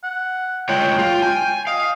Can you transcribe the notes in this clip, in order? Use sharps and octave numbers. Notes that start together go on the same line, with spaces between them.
F#5
G#3 F4 C#5 G5
F4
G#5
D#5 F5